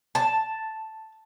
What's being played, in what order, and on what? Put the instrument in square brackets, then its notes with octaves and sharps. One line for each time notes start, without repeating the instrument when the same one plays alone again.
[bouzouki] A5